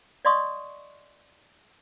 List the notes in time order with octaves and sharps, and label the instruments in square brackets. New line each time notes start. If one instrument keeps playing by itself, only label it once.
[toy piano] D5 D#5 F5 C6 C#6 D#6